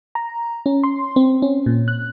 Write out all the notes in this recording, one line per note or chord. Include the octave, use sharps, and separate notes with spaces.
A#5
C#4
C6
C4
C#4
A#2
F#6